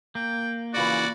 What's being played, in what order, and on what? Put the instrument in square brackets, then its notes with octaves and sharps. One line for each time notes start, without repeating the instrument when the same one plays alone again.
[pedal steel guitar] A#3 [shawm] G5
[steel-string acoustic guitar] F2 C#3 E3 [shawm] F#4 [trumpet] D5